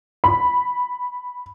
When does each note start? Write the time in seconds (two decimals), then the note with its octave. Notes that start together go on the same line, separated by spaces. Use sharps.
0.24 B5